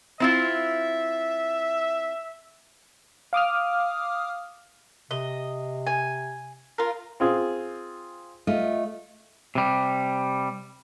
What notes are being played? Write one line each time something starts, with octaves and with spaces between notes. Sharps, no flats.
C4 E4 F4 E5
F5 D6 D#6 F6
C3 D#5
G#5
F4 A#4
C4 F4 G#4
A3 F4 D#5
C3 G3